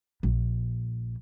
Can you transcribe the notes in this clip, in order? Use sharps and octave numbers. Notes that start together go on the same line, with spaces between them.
A#1